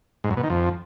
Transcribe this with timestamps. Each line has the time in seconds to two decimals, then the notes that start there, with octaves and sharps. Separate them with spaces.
0.24 G#2
0.31 F#2
0.37 B2
0.43 D#3
0.50 F2